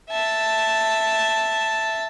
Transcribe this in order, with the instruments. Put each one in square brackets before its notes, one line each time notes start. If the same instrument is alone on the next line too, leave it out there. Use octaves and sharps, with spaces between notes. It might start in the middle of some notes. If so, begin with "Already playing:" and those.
[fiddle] E5 A5